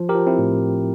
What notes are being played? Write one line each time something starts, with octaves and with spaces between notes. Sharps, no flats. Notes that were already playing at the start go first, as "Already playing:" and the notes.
Already playing: F3
G4 A#4
F3
C4 E4
A2